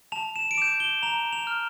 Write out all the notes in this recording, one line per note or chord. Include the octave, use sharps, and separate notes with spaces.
A5 F7
E7
D7
D6 G6 E7
G7
A#5 F7
F7
F6